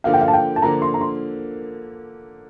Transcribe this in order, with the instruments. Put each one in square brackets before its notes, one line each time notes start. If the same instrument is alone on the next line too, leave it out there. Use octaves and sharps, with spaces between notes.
[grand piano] D3 F3 A#3 [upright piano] F5
[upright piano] G5
F5
A5
G5
A5
[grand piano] D3 F3 A#3 [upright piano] A#5
[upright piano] C6
A#5
C6